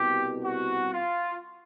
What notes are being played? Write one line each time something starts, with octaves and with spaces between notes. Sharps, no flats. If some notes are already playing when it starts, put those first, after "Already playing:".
Already playing: C2 B2 G4
F#4
F4